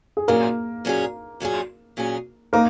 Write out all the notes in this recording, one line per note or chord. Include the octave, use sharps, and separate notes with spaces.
G#4
A#2 F#3 A#3 C#4 G#4 A#4
A#2 F#3 C#4 G#4
A#2 F#3 C#4 G#4
A#2 F#3 C#4 G#4
A#3 D#4 A#4